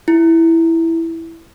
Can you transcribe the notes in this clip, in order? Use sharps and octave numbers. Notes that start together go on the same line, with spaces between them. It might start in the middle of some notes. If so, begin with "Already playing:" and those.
E4